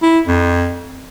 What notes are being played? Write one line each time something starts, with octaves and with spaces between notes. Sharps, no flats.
E4
F2